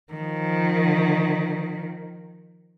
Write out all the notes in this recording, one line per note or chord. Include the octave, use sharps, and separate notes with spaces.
D#3 F3